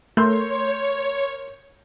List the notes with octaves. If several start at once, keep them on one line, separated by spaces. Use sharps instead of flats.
A3 A#4 C#5 C6 G6